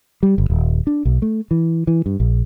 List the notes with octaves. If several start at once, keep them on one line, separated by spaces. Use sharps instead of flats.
G3
G1
D#1
D4
B1
A3
E3
E3
G2
A#1